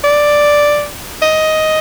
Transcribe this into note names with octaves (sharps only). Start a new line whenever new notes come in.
D5
D#5